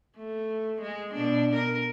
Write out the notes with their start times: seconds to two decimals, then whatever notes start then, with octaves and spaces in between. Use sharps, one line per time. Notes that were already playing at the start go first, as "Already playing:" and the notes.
0.17 A3
0.81 G#3
1.14 B2 D4
1.56 A#4